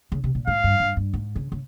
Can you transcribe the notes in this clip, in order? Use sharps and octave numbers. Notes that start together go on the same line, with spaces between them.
C#3
C3
A#2
G#2 F5
G2
G2
G2
G#2
C#3
C#3